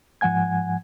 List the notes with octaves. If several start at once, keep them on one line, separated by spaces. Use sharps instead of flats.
G#2 F3 F#5 G#5 G#6